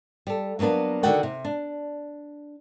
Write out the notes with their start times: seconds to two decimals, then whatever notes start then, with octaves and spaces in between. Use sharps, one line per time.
0.27 G3 A4
0.59 F#3 A#3 B3 D4 B4
1.03 D3 D#3 F#4 D5 F#5 G5
1.23 C3
1.45 D4